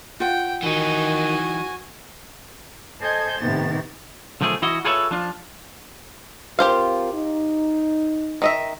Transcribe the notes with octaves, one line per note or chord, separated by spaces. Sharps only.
F4 F#5 G5
D#3 E3 D#4 F#4 G#5
A4 C5 D#5 G#5 G6 G#6
A2 C3 D#3 B3 A6
B1 D3 F3 A3 G#4
E3 E4 F#4 D#5
F4 G#4 A4 B4 C#5 E5
F3 D4 F4
C4 F4 G4 A#4 C5 F5
D#4
D#3 D#5 E5